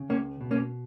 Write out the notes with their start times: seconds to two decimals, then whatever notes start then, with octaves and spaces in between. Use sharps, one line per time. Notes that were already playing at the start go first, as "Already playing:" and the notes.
Already playing: C#3
0.09 C#2 A#3 C#4
0.41 B2
0.51 A#3 C#4